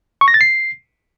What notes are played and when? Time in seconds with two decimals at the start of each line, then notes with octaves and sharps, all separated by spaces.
0.21 C#6
0.28 A#6
0.34 A6
0.41 C7